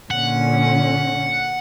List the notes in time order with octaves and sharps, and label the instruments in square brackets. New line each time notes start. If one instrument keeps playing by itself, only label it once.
[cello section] A#2 D3 C#4 [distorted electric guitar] F#5